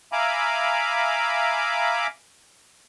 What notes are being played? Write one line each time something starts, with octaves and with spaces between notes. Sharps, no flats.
E5 F5 G#5 A#5 B5 D6